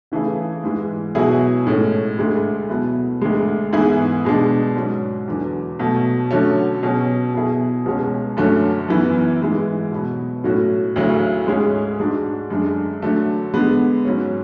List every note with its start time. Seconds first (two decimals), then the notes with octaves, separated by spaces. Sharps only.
0.12 C#3 E3 A3 E4 G#4
0.64 G#2 E3 G#3
1.15 B2 F#3 B3 E4 G#4
1.67 A2 G#3 C#4
2.19 D2 D3 G#3
2.69 B2 F#3 B3 E4
3.21 D2 D3 G#3
3.73 G#2 E3 B3 E4 G#4
4.25 B2 G#3 D4
4.76 G#2 F#3 C#4
5.28 E2 D3 F#3
5.79 B2 F#3 A3
6.31 D3 F#3 A3 C#4
6.83 B2 F#3 C#4 G#4
7.34 B2 F#3 B3 E4 G#4
7.86 C#2 B2 G#3 C#4
8.37 F#2 D3 A3 C#4 F#4
8.89 F#2 E3 B3
9.41 G#2 E3 G#3
9.92 B2 F#3 B3
10.44 A2 F#3 C#4 F#4
10.96 D2 C#3 F#3 C#4 E4
11.47 G#2 G#3 C#4 G#4
11.99 G#2 G#3 D4 F#4
12.50 F#2 D3 G#3 D4
13.02 D3 F#3 A3
13.54 D3 G#3 B3
14.05 G#2 F#3 C#4